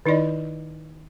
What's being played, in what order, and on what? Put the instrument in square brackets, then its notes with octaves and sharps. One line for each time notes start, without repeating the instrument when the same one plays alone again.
[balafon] D#3 D#4 E4 D5 D#5